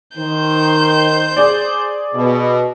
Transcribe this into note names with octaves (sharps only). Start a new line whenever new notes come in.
D#3 C5 G6
G#4 D5
B2